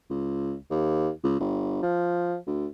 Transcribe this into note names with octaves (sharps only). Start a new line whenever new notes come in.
C#2
D#2
C#2
G1
F3
D2